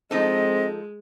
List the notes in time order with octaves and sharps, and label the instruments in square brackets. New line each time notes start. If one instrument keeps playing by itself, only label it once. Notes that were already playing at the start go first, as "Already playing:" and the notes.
[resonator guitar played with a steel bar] F3 D#4 A4 [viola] G#3 [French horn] C4 [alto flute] D#5